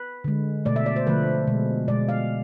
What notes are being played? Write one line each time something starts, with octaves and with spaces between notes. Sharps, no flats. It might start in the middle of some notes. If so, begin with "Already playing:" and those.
Already playing: B4
D3 G#3
B2 A3 D5
E5
D5
C5
D3 F3 A3 B4
B2 G#3
B2 G#3 D5
F5